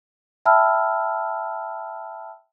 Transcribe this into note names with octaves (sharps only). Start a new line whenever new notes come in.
E5 G5 A5 B5 E6 F6